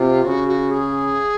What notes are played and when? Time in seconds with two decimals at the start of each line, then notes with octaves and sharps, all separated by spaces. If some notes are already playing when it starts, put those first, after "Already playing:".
Already playing: C3 F4
0.25 C#3 F#4
0.48 F#4
0.71 G#4